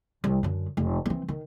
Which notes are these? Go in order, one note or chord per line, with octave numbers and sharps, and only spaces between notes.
C2
F#2 D3
F1
E3 C4
D#3